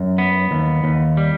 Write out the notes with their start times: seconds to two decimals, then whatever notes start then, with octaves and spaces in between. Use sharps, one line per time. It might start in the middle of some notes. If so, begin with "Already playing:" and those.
Already playing: F#2
0.18 B3
0.51 D#2
0.84 D#2
1.17 G3